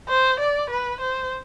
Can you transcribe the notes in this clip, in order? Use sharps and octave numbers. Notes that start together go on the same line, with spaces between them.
C5
D5
B4
C5